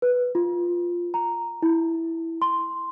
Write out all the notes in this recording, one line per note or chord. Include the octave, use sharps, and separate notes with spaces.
B4
F4
A#5
E4
C6